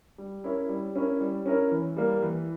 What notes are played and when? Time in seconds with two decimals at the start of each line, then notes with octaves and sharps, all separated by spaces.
0.18 G3
0.44 C#4 E4 A#4 C#5
0.69 G3
0.96 C#4 E4 A#4 C#5
1.21 G3
1.46 C#4 E4 A#4 C#5
1.72 E3
1.96 G3 A#3
2.22 E3